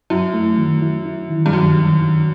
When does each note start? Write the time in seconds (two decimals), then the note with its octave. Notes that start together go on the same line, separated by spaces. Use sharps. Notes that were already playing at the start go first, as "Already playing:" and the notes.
0.10 F#2 E4
0.34 A3
0.58 D#3
0.82 E4
1.06 E4
1.30 D#3
1.46 G2
1.53 F#2 D#3
1.77 D#3
2.01 D#3